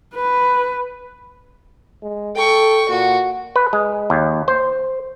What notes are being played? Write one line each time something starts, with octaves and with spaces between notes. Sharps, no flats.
B4
G#3
A4 G5 C#6
A#2 F#4
B4
G#3
D#2
C5